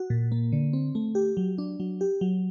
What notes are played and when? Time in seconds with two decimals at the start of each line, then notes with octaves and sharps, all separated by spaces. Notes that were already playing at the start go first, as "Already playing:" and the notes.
Already playing: F#4
0.10 A#2
0.32 A#3
0.52 D3
0.73 C4
0.95 A3
1.15 G4
1.37 F#3
1.58 D4
1.80 F#3
2.01 G4
2.21 F#3